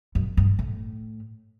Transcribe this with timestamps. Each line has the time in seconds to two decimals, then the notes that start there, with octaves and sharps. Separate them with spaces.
0.15 F#2
0.37 G2
0.59 A2